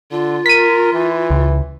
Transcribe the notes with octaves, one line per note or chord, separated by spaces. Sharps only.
D3 F4
A#4 B6 D#7
E3
C#2